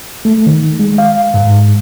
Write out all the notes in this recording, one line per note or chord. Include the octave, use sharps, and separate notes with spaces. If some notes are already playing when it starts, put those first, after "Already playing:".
A3
D#3
G#3
F5
G#2